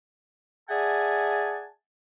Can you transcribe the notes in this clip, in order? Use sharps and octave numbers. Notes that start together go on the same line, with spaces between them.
G#4 D5 E5 F#5 G#5 A5